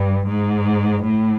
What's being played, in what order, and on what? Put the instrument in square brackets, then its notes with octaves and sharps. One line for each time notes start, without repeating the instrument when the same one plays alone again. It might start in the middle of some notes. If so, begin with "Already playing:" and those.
Already playing: [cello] G2
G#2
A2